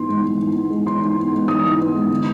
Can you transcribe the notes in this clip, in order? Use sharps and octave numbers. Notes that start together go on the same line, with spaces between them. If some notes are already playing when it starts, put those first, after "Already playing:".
Already playing: G#2 E3 B3 C6
G#3
E3
G#2
B3
G#3
E3 C6
G#2
B3
G#3
E3 D#6
G#2
B3
G#3
D3